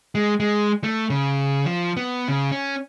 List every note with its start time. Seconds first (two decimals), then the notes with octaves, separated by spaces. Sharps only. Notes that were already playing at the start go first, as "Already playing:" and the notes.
0.15 G#3
0.40 G#3
0.84 A3
1.10 C#3
1.66 F3
1.97 B3
2.28 C#3
2.52 C#4